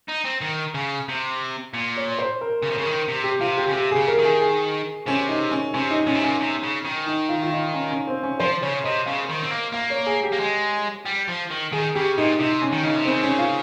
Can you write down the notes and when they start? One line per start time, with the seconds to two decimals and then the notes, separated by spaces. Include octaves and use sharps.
0.08 D#4
0.24 C4
0.41 D#3
0.74 C#3
1.08 C3
1.74 A#2
1.97 C#5
2.19 C5
2.41 A#4
2.63 C#3
2.70 C3
2.74 C#3 A#4
2.86 D#3
3.08 C3
3.24 G4
3.40 C3 F4
3.57 G4
3.68 C#3
3.74 C3 G4
3.91 C#3 G#4
4.07 A#4
4.18 D#3
4.24 G#4
4.41 G#4
5.07 C3 C#4
5.29 D#4
5.51 C#4
5.74 C3 C#4
5.91 D#4
6.06 A#2 C#4
6.15 C3
6.24 A#2 C#4
6.40 C3
6.63 C#3
6.85 D#3
7.06 D#4
7.29 F4
7.43 F4
7.51 D#4
7.74 C#4
7.91 C#4
8.07 C4
8.23 C#4
8.39 F3 C5
8.62 C#3 C#5
8.84 C3 D#5
9.06 C#3 F5
9.29 D#3
9.43 C4
9.51 A#3
9.73 A#3 F5
9.90 C#5
10.06 G#4
10.23 G4
10.33 A#3
10.40 G#3
11.06 G3
11.29 F3
11.51 D#3
11.72 D#3 G#4
11.95 C#3 G4
12.18 A#2 D#4
12.39 C3 D#4
12.62 C#4
12.72 D#3
12.84 C#3 D#4
12.96 C3
13.05 C#3 C4
13.23 C#4
13.39 F4